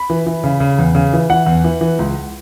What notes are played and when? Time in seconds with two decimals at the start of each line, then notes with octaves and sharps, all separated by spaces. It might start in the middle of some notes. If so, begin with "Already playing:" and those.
Already playing: B5
0.10 E3
0.26 E3
0.44 C#3
0.60 C#3
0.79 E2
0.95 C#3
1.13 E3
1.30 E3 F#5
1.46 E2
1.64 E3
1.81 E3
1.99 C#2